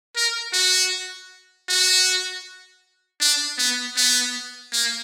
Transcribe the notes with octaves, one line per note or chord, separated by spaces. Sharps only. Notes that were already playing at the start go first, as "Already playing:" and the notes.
A#4
F#4
F#4
D4
B3
B3
A#3